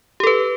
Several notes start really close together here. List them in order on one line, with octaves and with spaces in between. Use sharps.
G4 A4 B4